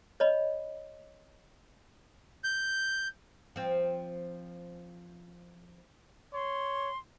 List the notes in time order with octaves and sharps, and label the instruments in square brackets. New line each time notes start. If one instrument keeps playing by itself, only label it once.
[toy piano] C#5 D#5 B5
[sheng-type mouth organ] G6
[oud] F3 C4
[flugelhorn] C#5 [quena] C6